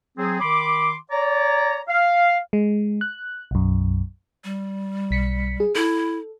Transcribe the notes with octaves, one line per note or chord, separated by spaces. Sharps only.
F#3 C4 G#4
D#3 B5 C6 D6
C#5 D5 A#5
F5
G#3
F#6
B1 F#2
G3
B1 B6 C#7
G#4
E4 A4